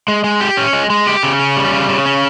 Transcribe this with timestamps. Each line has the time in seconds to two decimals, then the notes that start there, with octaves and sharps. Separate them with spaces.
0.08 G#3
0.24 G#3
0.41 G4
0.57 C#4
0.73 G#3
0.90 G#3
1.07 G4
1.23 C#3
1.40 C#4
1.56 G3
1.73 C#3
1.89 C#3
2.06 C#4